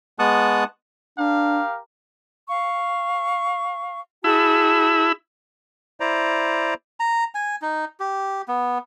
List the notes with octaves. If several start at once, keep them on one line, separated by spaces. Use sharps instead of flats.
G#3 B3 A5 C#6 D#6 F#6
D4 G4 A#4 F5
F5 C#6
E4 F#4 G#4 A5 B5 E6
E4 C5 D5 A#5
A#5
G#5
D#4
G4
B3